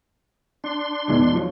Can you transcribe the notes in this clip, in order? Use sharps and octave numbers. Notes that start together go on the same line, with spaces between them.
D4 C6
E2 G#2 B2
F3 F#3